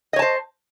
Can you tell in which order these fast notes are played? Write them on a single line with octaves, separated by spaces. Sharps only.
D#5 C#5 A5 C5